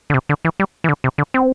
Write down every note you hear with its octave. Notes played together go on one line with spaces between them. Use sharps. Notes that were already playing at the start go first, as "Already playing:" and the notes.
D3
C3
D3
E3
G3
E3
D3
C3
D3
C4